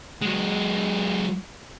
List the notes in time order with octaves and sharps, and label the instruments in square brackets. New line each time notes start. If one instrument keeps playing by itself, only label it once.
[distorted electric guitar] F#3 G#3